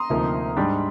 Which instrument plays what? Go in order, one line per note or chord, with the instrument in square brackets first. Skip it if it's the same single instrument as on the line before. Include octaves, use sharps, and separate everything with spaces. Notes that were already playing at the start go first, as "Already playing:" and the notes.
Already playing: [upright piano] A#5 C6 D#6
[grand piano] D2 C3 F3 A#3 D#4
G#2 G3 D4